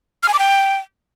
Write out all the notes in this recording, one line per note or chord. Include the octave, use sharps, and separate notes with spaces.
F6
G#5
D6
G5